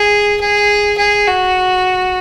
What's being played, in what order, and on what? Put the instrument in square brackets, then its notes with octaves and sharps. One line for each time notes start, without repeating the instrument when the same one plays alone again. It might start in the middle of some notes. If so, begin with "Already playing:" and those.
Already playing: [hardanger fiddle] G#4
G#4
G#4
F#4